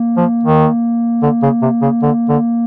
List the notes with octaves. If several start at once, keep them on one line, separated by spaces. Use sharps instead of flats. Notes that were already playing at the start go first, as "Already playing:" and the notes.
Already playing: A#3
F3
D#3
D3
C#3
C3
C#3
D3
D3